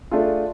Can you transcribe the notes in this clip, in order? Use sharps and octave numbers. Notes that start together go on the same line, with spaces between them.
A3 D4 F4 G#4